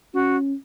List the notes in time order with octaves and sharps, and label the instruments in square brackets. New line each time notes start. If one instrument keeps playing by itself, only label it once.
[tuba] C#4 [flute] F#4